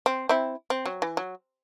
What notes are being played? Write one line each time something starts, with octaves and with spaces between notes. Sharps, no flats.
C4
C4 E4
C4
F#3
E3
F#3